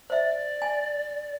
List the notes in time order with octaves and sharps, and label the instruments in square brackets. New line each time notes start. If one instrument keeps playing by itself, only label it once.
[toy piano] C5 E5 [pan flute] D5
[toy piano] G#5